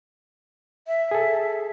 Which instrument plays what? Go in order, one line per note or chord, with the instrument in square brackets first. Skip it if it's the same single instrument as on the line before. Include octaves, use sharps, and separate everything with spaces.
[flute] E5
[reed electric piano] G#4 A4